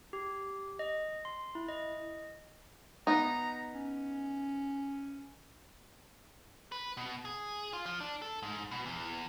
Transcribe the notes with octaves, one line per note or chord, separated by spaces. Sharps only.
G4
D#5
C6
E4
D#5
B3 D#4 A#5
C#4
B4
B2
G#4
F4
F3
D4
A4
G#2
B2
E2